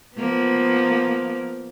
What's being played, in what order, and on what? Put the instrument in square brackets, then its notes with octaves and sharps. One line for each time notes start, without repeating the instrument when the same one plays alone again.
[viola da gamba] F3 A#3 B3